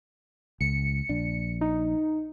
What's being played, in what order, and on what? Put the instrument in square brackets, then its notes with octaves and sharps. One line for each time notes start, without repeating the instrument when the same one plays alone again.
[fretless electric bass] C#2 [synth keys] C#7
[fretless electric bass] A#1 D4
[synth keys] D#4